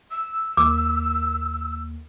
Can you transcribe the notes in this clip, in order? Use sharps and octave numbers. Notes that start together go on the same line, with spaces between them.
E6
D#2 A#3 D6